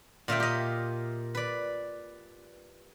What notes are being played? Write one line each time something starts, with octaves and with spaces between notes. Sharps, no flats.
A#2 F4 E5 G5
G4 D#5
B4 D5